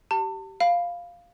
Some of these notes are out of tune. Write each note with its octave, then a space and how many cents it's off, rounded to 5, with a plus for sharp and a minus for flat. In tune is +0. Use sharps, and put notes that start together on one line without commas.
G4 -20 A5 +35
F5 +0 B5 +0